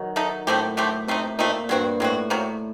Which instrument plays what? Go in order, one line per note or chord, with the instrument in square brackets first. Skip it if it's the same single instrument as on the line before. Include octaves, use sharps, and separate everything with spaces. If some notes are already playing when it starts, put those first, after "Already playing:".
Already playing: [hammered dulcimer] D#3 F#3
[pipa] A3 D#4 A4
[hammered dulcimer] A2 [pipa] D3 A3 C4 G4
[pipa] D3 A3 C4 G4
[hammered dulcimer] C3 [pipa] A3 C4 D#4
[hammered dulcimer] A#2 [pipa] A3 C4 D#4
[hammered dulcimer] G2 [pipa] F#3 C4 F#4
[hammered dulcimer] A2 [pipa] F#3 C4 F#4
[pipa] C3 F#3 A#3